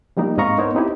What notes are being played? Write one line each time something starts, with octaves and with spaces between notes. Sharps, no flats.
F3 G3 A#3 D#4
G#2 C4 D#5 F5 A#5 C#6
B3 D#4 A#4 C5 C#5
C4 D#4 E4 G4